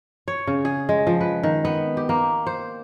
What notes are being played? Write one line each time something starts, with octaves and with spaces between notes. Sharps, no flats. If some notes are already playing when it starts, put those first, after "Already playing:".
C#5
C#3
G#4
G#3
F3
B4
D#3
B3
G4
A#3
C5